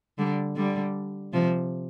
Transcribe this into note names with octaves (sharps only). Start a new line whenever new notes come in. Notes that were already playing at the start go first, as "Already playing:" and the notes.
D3 G3
D3 G3
C3 F3